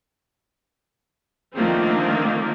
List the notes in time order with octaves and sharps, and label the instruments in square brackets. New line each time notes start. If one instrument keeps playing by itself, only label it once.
[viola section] D3 D#3 F3 A3 A#3 C4